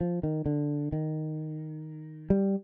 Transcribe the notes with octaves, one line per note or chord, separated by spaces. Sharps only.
F3
D#3
D3
D#3
G3